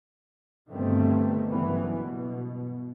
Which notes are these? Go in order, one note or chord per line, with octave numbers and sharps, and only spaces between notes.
G1 G2 B2 D#3 A3 C4
F#1 G2 E3 B3
B2